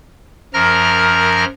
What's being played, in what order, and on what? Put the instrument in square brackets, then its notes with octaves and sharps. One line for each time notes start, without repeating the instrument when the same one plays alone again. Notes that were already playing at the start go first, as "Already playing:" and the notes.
[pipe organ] F#2 F3 A#4 A#5 F6 A#6